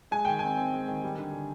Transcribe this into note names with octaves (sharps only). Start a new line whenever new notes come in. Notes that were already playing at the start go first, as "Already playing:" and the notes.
G#3 G#5
D#3 G5
C4 G#5
C4
G#3
D#3
G3
D3
D3